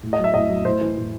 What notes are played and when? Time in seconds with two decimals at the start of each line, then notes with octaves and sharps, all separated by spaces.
0.03 A2
0.13 D#5
0.19 F#3
0.24 E5
0.34 A2 D#5
0.50 F#3
0.65 A2 C5
0.81 E3
0.97 A2